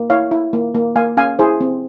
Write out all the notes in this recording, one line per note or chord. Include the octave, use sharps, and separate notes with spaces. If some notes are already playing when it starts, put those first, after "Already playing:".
Already playing: A#3
E4 C#5 F5
E4
A#3
A#3
A#3 F5 G#5
C#4 F5 G#5
E4 G#4 C5
C4